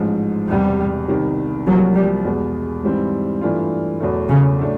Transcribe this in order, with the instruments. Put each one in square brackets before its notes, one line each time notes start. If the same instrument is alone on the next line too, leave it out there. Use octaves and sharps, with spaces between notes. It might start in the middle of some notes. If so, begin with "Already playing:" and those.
Already playing: [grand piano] A1 G#2 F3 G#3
[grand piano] E1 E2 C3 [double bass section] G3
[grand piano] C2 C3 D#3 G3
[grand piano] C2 C3 F3 A#3 [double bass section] F#3
[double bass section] G3
[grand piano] E2 B2 G#3
G#2 E3 G3 C4
G2 E3 A3 D4 F4
E2 B2 F#3 A3
[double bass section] C#3
[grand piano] A2 F#3 A3 D4